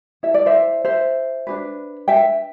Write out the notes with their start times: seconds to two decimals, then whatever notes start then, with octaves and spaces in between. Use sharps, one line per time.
0.23 E4 A4 E5
0.34 D5
0.46 C5 E5
0.85 C5 E5
1.47 D4 G4 B4
2.08 E5 G5